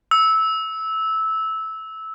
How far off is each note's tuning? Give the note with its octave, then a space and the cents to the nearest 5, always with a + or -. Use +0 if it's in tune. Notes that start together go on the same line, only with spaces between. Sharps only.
E6 -15